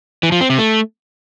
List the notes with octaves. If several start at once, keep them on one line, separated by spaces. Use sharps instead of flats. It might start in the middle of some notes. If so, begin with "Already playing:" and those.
E3
F3
C4
C3
A3